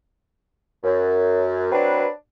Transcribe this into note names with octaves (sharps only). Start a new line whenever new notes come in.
F#2
F#3 C4 D4 B4